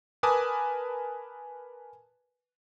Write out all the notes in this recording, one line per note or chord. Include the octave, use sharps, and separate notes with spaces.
A#4 B4 G#5 A5 D6 D#6